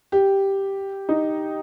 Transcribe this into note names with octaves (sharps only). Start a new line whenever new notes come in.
G4
D#4